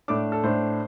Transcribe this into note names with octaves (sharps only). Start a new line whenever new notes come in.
A2 A3 D4 D6
A4
A2 A3 D4 C5